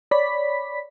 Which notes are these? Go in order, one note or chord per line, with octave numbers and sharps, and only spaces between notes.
C#5 D5 B5 B6